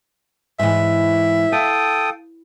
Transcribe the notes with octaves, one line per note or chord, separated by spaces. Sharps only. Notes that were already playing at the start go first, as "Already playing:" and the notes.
G#2 E3 E5
A4 F5 G5 D#6